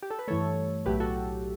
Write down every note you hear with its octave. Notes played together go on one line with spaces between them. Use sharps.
G4
A4
B4
G2 E3 A3 A4 C#5
B1 A2 F#3 A3 G4 B4
F#4 A4